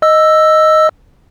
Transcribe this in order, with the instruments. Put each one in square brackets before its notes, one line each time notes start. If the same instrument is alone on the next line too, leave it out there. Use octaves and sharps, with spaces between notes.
[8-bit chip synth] D#5 E6